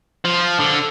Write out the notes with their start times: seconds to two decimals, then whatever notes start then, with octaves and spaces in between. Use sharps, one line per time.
0.25 F3
0.59 D3